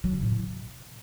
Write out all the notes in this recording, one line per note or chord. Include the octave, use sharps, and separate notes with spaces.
F#3
C#3
A2
C3